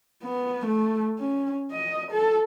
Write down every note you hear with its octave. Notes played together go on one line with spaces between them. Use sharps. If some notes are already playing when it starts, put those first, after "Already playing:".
B3
A3
C#4
D#5
A4